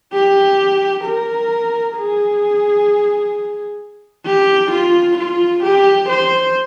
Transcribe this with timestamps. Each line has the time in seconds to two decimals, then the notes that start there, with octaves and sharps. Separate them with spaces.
0.13 G4
1.04 A#4
1.96 G#4
4.26 G4
4.71 F4
5.18 F4
5.63 G4
6.09 C5